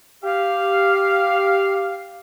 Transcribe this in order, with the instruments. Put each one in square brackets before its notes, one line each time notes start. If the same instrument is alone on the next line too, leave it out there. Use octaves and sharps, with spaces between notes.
[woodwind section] G4 F5